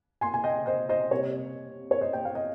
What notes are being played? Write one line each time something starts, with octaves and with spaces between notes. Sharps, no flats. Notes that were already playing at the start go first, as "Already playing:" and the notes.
G#5 C6
G#5
D#5 G5
C5 D#5
C5 D#5
C3 G3 A#3 C#5
C#5
C5 D#5
G5
F5
D#5